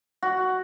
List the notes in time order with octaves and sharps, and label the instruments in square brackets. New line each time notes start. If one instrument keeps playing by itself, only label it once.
[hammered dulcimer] F#4